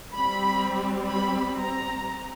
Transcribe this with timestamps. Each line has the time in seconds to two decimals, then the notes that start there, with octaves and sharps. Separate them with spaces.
0.14 G3 C4 B5
1.09 B5
1.56 A#5
2.04 C4